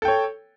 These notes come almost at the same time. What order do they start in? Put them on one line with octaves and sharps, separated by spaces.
A4 G5 C#5